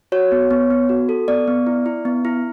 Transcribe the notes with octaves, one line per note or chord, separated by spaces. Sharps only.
F#4 C#5
B3
B3
B3
F#4
A4
B3 D5
B3
E4
E4
B3
E4